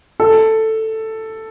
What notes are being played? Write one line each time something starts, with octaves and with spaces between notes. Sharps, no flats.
A4